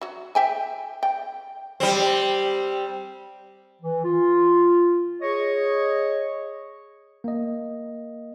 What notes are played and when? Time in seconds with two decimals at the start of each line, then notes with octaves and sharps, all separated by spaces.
0.01 F#3 F#4
0.35 E5 G5 G#5
1.03 G5
1.80 G3 C4
3.81 E3
4.04 F4
5.22 G#4 C#5 D#5 C#6
7.24 A#3 D#5